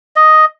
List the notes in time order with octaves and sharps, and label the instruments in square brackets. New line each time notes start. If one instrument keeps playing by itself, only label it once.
[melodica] D#5